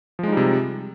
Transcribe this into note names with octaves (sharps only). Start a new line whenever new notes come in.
C3 F3 G3 G#3 D#4